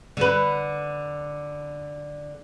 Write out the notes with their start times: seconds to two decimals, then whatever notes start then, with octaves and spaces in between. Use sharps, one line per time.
0.17 D3 B4